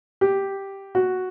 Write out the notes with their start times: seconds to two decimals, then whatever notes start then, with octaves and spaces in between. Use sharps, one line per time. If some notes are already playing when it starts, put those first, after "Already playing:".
0.21 G4
0.95 F#4